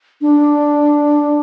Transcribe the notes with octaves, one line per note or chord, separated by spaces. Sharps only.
D4